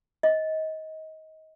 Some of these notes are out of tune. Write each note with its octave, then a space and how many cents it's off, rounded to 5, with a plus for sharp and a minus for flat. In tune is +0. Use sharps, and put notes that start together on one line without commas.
D#5 +25